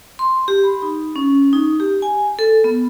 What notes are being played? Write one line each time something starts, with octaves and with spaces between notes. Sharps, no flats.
C6
G4
B5
D#4
C#4
D#4
G4
G#5
A4
B3